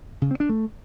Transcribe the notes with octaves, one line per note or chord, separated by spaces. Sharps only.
C#3
C4
D4
A3